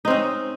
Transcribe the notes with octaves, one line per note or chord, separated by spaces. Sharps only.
C4 C#4 D#4